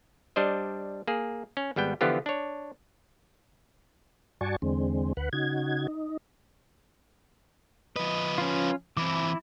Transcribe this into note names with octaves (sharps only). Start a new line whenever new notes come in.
G3 D4 C5 D#5
A#3 G#4
C#4
G#1 G3 B3 G5
D3 E3 F3 B3 F4 G4
D4 C#5
G2 F#4 D5 G#5 A5 C#6
E2 D3 G#3 C4
D2 B4 F#5
C#3 D#4 F#4 G#6
D#4
F3 B4 D#5
C#4 F4
E3 C4 E4 D6